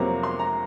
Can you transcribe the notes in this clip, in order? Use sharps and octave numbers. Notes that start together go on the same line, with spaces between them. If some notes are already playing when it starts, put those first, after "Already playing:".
Already playing: F2 C3 F#3 A#3 A#5
C6
A#5